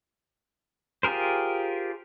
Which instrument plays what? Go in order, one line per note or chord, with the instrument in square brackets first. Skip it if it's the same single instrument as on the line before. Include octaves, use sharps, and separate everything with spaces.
[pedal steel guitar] F4 G4 G#4 A#4 C5